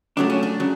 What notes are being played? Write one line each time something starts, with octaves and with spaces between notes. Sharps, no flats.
C#2 C#3 F#3 A3 D4
C#4
D4
C#3 F#3